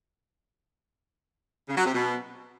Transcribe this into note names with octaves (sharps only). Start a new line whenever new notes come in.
C#3
F#3
C3
B2